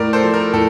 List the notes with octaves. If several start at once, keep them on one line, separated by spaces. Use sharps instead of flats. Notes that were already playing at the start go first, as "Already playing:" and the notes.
Already playing: A2 A#4 D5
A4 C5
F3
A#4
A2 A4